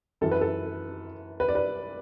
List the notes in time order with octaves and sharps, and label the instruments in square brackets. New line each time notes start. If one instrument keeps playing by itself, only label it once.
[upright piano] F#2 E3 A4
B4
A4
B4
D5
B4